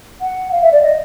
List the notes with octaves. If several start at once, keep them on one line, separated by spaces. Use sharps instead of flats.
F#5
F5
E5
D5
D#5